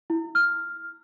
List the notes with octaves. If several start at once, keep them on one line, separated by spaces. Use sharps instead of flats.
E4
F6